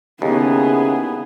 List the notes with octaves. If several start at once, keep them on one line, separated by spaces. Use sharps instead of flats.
D#2 C#3 B3 E4 G#4